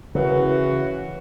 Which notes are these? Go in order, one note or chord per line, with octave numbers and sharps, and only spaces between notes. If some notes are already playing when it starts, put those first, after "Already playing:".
C#3 E3 E4 F#4 A#4 B4